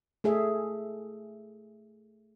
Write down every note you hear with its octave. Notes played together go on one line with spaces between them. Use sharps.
A3 G#4 E5